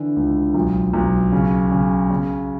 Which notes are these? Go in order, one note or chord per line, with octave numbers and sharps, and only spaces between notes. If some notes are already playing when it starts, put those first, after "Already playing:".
Already playing: D3 E3
C#2
B1
B1
C#3
C#3
C#3